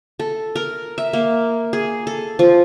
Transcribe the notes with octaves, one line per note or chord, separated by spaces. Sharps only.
A4
A#4
E5
A#3
G#4
A4
F3